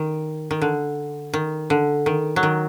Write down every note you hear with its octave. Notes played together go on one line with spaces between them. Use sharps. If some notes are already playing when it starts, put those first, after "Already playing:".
Already playing: D#3
D#3
D3
D#3
D3
D#3
F#3
D#3